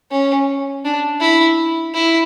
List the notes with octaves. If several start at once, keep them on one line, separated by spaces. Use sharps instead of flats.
C#4
D4
E4
E4